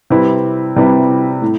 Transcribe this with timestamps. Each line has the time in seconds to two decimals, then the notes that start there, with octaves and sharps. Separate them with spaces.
0.10 C3 G3 C4 E4 B4
0.76 C3 G3 C4 E4 B4
1.42 A2